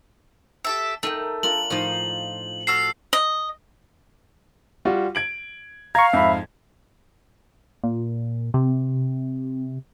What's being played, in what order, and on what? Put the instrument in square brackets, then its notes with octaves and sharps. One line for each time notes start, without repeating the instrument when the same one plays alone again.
[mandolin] G4 A4 E5
[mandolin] A3 [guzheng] D#4 A#4 G5
[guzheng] D4 F4 A#4 [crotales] F#7
[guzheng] A2 F3 [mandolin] D#4 F4
[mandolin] F#4 A4 F6 [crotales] C7
[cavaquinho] D#5
[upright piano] G3 F4 F#4
G#6 D7 F#7
[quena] F5 [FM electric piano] A#5 C#6 [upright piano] G#6
[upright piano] F2 G#2 [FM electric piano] E5 B5
[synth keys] A#2
C3